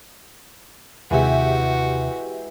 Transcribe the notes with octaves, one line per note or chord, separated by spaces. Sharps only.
D#2 C3 E3 G#3 F#4 G4 E5